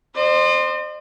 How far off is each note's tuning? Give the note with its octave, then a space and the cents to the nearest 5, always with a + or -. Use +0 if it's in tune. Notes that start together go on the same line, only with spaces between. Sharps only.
C5 +0 D#5 -45